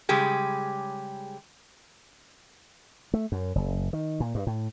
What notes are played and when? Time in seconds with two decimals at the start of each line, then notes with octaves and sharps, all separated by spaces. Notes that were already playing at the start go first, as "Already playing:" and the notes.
0.09 C#3 G3 G#3 G4 G#4
3.14 A3
3.32 F#2
3.55 F#1
3.93 D#3
4.20 A#2
4.35 G2
4.47 A2